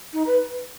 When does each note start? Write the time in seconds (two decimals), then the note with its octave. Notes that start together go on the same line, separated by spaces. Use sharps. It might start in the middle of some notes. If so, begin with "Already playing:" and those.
0.13 D#4
0.27 B4